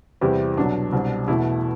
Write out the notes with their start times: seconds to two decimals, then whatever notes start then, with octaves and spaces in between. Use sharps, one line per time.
0.21 E2 C3 G3 C4 E4 G4
0.57 C2 B2 F#3 D4
0.93 C2 B2 G3 C4
1.28 E2 B2 A3 E4